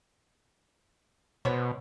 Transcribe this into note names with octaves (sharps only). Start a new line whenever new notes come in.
B2 B3 C5 C#5